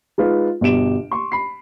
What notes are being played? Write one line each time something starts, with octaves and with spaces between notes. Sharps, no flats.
G#3 D#4 F4 B4
G1 B2 G4 D7 E7
C6 C#6
B5 C7